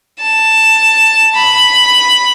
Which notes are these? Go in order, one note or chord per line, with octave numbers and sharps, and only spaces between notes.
A5
B5